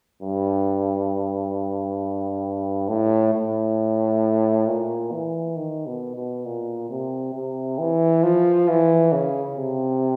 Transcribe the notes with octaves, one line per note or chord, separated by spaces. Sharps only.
G2
A2
A2
A#2
E3
D#3
B2
B2
A#2
C3
C3
E3
F3
E3
C#3
C3